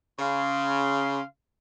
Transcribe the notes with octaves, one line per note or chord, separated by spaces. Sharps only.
C#3 F5 C6